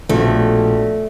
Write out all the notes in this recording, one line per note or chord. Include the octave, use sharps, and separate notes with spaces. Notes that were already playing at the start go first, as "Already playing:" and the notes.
A#1 B2 A3